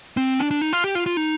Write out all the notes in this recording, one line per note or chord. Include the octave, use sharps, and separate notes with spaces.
C4
D4
D4
D#4
F4
G4
F4
F4
D#4